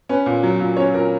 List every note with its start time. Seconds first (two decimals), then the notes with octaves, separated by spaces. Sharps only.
0.09 C#4 B4
0.26 A#2
0.43 F#3
0.60 A#2
0.77 C#4 C#5
0.94 A#2 A#4